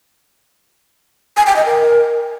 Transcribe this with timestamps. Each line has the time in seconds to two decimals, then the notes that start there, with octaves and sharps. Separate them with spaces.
1.37 G#5
1.46 G5
1.56 D#5
1.65 A#4